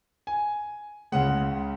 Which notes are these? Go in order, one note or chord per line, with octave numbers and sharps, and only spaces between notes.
G#5
C#2 C#3 G#3 F#5